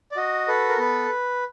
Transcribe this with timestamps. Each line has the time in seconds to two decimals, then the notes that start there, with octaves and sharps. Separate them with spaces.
0.12 D5
0.17 F#4 D#5
0.48 A4 B4
0.69 A#4
0.79 B3 B4